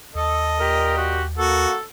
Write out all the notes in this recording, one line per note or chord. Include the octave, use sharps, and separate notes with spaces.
D#2 A4 D#5
A#2 G4 A#4
F#4
A#3 F#4 A4